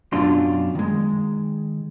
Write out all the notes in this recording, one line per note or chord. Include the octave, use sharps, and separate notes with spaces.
F#2 B2 D4 F4 C6
D#3 G#3